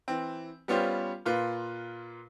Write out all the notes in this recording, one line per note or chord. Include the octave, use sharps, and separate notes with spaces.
E3 C4
G3 B3 C#4 F4 G4 C5
A#2 F4 B4